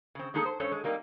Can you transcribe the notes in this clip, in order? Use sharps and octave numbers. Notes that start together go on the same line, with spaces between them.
C#3 C4
G#3 A#3 D#4 G#4 A4
C5
G2 C#4 A4 C5 C#5
G#3
G3 A#3 C4 D#4